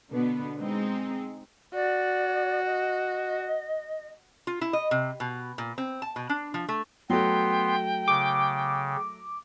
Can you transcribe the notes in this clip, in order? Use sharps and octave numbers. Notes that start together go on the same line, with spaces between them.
B2 D3 B3
G#3 C4 D#4
F#4 D5
D#5
F4
E4
D#5
C3
B2
A#2
C4
A5
B2
D4
F3
A3
F#3 A3 B3 G5 C6
C#3 D6